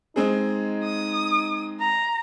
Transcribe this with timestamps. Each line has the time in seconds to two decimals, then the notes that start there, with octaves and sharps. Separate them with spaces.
0.16 G#3 C4 D#4 G#4
0.84 D#6
1.80 A#5